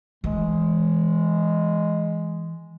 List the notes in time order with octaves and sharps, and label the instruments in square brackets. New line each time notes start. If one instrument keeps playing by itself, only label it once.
[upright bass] E3 [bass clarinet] G#3